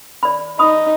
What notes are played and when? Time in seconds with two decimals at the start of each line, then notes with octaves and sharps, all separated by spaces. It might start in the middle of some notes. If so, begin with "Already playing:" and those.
0.23 D5 B5
0.59 D#4 B5 D#6